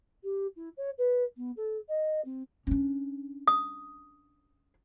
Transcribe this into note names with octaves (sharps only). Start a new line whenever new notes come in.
G4
E4
C#5
B4
B3
A4
D#5
C4
C#4 D4
D#6